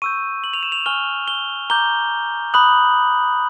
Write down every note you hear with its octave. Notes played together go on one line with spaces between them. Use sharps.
C#6 E6 G6 D#7
F#7
F7
E7
F7
G#5 C#6 F6 G7
G7
A#5 D6 G6 G7
B5 D#6 F#6 F#7